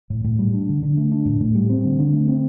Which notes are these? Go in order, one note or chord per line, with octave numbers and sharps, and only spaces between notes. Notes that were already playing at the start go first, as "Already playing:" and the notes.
A2
A2
G3
D4
D3
D3
A3
D4
A2
A2
G3
C4
D3
D3
A3
C4